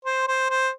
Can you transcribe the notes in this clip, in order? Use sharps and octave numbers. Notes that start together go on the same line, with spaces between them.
C5
C5
C5